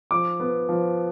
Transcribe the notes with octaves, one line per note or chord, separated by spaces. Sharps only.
F3 D6
B3
F3